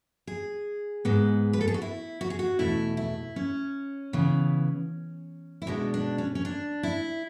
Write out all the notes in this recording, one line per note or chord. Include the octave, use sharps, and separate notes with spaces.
G#4
G#2 G#3 B3
B4
A4
G#4
F#4
E4
F#4
G#4
F#4
E2 B2 A3 E4
E4
C#4
C#3 E3 B3
E4
B2 G#3 B3 D4
D4
C#4
C#4
D4
E4